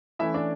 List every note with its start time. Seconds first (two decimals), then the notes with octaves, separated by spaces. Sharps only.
0.19 E3 A3 C#4 E4 E5
0.34 D4 D5